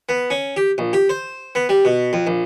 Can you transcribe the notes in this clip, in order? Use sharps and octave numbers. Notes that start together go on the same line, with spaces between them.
B3
C#4
G4
A#1
G4
C5
B3
G3
B2
F2
A#1